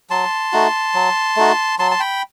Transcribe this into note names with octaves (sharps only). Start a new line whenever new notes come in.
F#3 A5 C6
A3 D#4 F#4
F#3
A3 D#4 F#4
F#3 A5 C6
A5
G5 B5